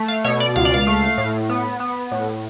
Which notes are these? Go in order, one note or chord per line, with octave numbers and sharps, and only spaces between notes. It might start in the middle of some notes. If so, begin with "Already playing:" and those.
Already playing: A3
F5
B2 C#5
D5
C#2 F5
D5
F5
A3
A2
B3
B3
A2